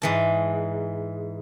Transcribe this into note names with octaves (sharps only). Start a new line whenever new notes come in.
G#2 E3 A5